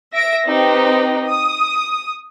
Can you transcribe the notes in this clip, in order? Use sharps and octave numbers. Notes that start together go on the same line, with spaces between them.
E5 A#6 D7
C4 D#4 G4 B4
D#6